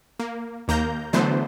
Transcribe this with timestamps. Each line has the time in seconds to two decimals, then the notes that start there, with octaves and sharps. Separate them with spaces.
0.19 A#3
0.68 D#2 A#3 A#5 G6
1.13 D3 E3 F#3 A3 B3 C5